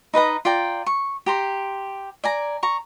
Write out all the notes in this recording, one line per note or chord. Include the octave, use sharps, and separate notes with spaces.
D#4 B4 D#5 A#5
F4 D5 G5 A#5
C#6
G4 A#5 C6
D5 G#5 A#5
A#5 C#6